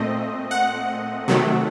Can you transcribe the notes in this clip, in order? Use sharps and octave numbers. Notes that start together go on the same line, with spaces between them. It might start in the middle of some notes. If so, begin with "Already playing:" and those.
Already playing: A#2 A3 C4 D#5
F#5
C3 D#3 F#3 A3